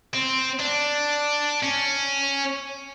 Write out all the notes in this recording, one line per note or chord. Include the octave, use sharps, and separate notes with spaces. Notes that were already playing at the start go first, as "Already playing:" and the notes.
C4
D4
C#4